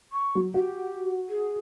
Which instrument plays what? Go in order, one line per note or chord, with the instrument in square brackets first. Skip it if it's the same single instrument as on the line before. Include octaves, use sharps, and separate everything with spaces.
[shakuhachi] C#6
[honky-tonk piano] F#3
[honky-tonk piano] F#4 [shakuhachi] G4
[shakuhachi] G#4